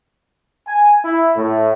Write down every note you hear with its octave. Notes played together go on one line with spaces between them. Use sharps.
G#5
E4
A2